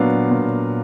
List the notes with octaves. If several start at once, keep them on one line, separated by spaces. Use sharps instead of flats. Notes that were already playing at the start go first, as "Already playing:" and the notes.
Already playing: A#2 F#3 B3 D4 F5
A#2